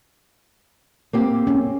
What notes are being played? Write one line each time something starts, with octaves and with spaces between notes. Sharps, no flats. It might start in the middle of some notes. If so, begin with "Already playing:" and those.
A#3 C4 G4
C#4